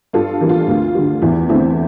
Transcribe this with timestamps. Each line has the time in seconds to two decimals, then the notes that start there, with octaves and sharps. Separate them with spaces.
0.13 G2 F4 A4
0.41 E3 G3 A#3
0.49 F4
0.68 D2
0.95 D3 G3
1.22 E2 E4
1.49 D3 A3 C4 E4